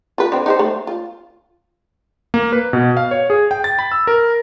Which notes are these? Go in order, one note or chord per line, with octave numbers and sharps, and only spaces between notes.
F4 B4
D3 C4
D#4 G4 C5
A3
F4
A#3
B4
B2
F5
C#5
G#4
G5
A6
B5
E6
A#4